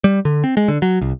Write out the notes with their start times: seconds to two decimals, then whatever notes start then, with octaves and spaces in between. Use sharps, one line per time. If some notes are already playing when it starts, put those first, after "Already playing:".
0.04 G3
0.25 D3
0.44 C4
0.57 G#3
0.68 D3
0.82 F#3
1.01 C2